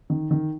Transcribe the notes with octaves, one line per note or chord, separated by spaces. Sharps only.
D#3
D#3